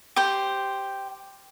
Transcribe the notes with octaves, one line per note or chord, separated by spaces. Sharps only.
G4 C5